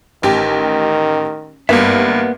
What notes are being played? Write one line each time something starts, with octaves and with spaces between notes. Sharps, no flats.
A1 D#3 G4
G#1 G2 A#3 B3 E5